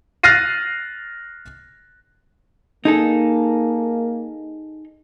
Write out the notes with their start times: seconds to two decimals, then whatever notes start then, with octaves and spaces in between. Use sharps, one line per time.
0.23 F6 F#6 A6 A#6 C7 D#7
2.85 A#3 D#4 G#4 A4